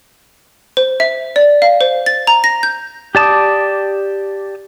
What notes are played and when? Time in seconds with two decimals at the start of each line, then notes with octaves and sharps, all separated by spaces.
0.77 C5
1.00 E5
1.36 D5
1.62 F5
1.81 C5
2.06 A6
2.27 A#5
2.44 A#6
2.63 G6
3.15 G4 D5 A5 D6 D#6